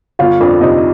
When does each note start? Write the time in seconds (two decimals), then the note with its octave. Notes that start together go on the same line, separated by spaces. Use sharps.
0.19 G1 F4 F5
0.40 F2 D4 D5
0.61 C3 D#4 D#5